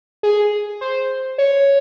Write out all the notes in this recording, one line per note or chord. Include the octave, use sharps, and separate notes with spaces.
G#4
C5
C#5